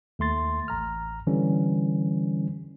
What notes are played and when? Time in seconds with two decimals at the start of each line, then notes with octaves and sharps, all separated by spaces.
0.19 D#2 A3 C6 A6
0.68 A1 A#5 F6
1.27 D3 E3 G3 C#4